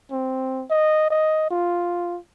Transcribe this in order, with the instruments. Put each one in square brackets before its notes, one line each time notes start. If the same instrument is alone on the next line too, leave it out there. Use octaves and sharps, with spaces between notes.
[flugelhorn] C4
D#5
D#5
F4